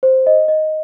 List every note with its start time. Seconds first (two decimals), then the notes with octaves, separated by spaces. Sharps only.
0.03 C5
0.27 D#5
0.48 D#5